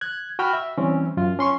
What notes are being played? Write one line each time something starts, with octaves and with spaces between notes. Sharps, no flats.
F#6 G#6
F#4 G5 B5 F6
E5
E3 G3 C4 C#4
F#2 F4
C#4 C6 C#6